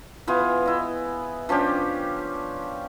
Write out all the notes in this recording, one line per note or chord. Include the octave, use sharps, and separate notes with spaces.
E3 B3 F4 G#4
E4 D#5
F3 C#4 D4 G4